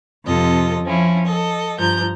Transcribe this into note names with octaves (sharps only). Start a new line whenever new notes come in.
F2 C3 F4 A4 D#5
F3 C#4 E4
A4 D#5
G2 F3 A#5 G6